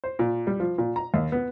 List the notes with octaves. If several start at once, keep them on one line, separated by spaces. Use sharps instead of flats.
C5
A#2
G3
F3
A#2
A#5
D#2
B3